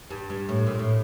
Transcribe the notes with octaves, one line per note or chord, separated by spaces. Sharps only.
G2
G2
A2
A#2
A2